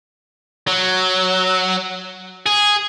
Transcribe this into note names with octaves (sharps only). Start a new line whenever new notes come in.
F#3
G#4